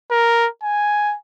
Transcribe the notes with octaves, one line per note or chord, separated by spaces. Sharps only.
A#4
G#5